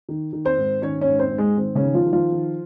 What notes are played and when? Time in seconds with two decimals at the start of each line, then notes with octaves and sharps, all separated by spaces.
0.09 D#3
0.33 D#3
0.45 C4 C5
0.58 G#2
0.82 D#3 C#4 C#5
1.01 C#4 C#5
1.07 G#2
1.19 C4 C5
1.32 G#2
1.38 G#3 G#4
1.57 D#3 C4
1.75 C#3 C#4
1.83 D#3
1.94 F3 F4
2.06 D#3
2.13 F3 F4
2.32 D#3